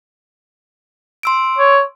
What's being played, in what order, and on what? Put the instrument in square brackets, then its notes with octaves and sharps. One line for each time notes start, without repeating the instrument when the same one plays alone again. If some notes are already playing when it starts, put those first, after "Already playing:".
[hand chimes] C6 E6 D7
[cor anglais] C#5